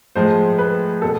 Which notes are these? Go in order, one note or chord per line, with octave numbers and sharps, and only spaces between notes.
A2 F3 G#3 C5
B4
B2 A4